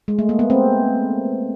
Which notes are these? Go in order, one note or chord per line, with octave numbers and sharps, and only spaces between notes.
G#3
A3
A#3
B3
C4